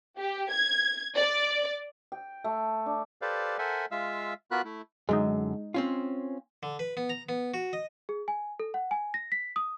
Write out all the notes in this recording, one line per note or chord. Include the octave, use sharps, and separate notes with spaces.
G4
G#6
D5
G5
A3
D4
G4 A4 B4 C5 D5 F5
A4 A#4 C5 E5 F#5 G#5
G#3 F4 E5 F5 E6
B3 F4 F#4 A#4 B5 F#6
A3 E4
F#2 D3 G#3 D#4
C4 C#4 F4
D3
B4
B3
A#5
B3
F#4
D#5
G#4
G#5
A4
F#5
G#5
A#6
B6
D#6